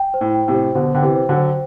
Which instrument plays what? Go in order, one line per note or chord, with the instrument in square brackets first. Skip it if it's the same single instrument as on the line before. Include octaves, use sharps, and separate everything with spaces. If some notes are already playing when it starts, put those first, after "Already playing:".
Already playing: [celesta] G5
C5
[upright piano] A2
[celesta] G5
[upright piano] A2 C3
[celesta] C5
[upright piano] B2 D3 [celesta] C5
[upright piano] D3 [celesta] G5
[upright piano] C3 E3
[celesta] C5
[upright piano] D3 F#3
[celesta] C5